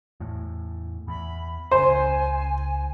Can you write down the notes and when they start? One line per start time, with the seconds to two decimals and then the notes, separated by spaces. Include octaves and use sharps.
0.20 E2 A2
1.08 E2 B5
1.71 F1 C#3 C5 G#5
1.86 C#2